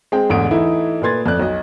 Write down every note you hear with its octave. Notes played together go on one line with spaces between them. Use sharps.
G#3 C4 G#4 C5 G5
A1 E2 G#2 D3 D#6 D7
E3 A3 D#4 E4
A#2 A3 B4 C6 G#6 A6
F2 A3 D5 F#6
B1 D#5